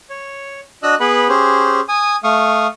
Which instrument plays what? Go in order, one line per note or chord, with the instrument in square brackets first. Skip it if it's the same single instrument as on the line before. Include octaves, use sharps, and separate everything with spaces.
[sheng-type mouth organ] C#5
D4 F#4 D#5 E6 F#6
B3 G#4 B4 F#5 B5
C#4 G4 G#4 C5
G#5 D#6
A3 F5 C#6 D#6